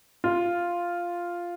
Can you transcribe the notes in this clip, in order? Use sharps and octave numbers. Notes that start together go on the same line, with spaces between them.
F4